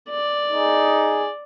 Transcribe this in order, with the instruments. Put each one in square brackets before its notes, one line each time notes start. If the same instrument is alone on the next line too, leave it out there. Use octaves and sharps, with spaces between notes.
[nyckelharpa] D5
[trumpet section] D#4 G#4